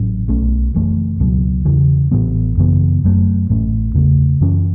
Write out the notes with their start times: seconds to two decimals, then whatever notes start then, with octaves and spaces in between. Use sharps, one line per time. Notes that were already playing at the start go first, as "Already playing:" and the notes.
Already playing: A1 A2 F#3 C#4
0.28 B1 B2 A3 C#4
0.74 F#1 F#2 E3 A3
1.20 C#2 B2 F#3
1.65 E2 C#3 E3
2.11 A1 A2 E3 B3
2.57 F#2 C#3 E3 B3
3.03 F#1 F#2 C#3 A3
3.49 A1 A2 A3 C#4
3.94 E2 C#3 A3
4.41 F#2 E3 C#4